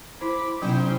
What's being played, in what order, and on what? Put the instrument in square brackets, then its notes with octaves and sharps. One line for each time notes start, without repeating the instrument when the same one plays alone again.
[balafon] E4 C5 [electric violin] B5 D6
[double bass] C3 [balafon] F#3 B3 [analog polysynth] C#4 C5 G5 [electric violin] D#4 E4